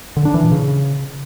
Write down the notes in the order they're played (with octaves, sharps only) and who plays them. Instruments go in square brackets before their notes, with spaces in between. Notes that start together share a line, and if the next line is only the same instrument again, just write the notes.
[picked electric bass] D3
D4
E3
A#2
C#3